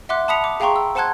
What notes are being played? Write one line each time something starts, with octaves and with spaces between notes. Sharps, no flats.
E5 F#5 C6 D6 F#6
A5 B5 D#6 B6 C#7 F7
D6
G#4 F5 G5 A#5 C6 C#6
E6
C5 F#5 A5 C6 F#6 G#6